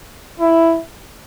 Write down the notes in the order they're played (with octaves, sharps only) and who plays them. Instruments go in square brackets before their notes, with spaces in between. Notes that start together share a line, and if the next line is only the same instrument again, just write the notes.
[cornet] E4